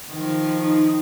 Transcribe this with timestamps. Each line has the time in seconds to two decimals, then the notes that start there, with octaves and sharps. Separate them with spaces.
0.12 D#3 F3
0.59 D#4